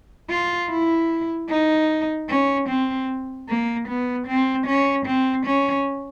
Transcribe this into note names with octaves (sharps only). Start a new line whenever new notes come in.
F4
E4
D#4
C#4
C4
A#3
B3
C4
C#4
C4
C#4